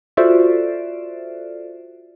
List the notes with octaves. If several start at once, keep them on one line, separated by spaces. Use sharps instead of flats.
F4 F#4 A4 C5 D5 E5